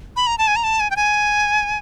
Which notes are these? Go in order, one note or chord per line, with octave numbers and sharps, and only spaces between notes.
B5
A#5
A5
G#5
A#5
A5
G#5
G5
G#5